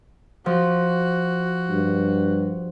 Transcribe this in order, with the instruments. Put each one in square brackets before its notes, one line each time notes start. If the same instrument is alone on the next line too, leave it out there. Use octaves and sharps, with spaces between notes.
[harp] F3 [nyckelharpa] F#4
[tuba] G2